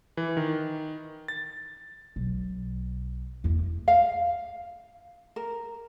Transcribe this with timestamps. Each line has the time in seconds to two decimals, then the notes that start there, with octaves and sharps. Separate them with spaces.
0.17 E3
0.37 D#3
1.28 A6
2.16 B1
3.44 E2 A#3
3.88 F5
5.36 A#4